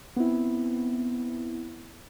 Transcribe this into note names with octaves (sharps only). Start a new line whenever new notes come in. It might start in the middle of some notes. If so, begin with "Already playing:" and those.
B3 C4 E4